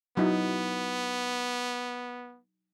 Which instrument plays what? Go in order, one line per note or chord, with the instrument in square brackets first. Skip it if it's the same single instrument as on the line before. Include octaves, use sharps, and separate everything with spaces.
[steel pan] F#3 D#4 E4 [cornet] B3